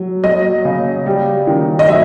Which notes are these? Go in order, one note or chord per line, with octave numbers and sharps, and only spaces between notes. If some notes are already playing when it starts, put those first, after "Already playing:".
Already playing: F#3
F#3 D#5
C#3
G3
D#3
D#5
F#3 E5